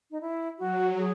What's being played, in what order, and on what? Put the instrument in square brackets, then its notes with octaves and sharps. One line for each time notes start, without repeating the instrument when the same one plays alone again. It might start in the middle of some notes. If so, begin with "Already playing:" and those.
[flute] D#4
E4
[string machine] F#3 [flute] F#4
[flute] G#4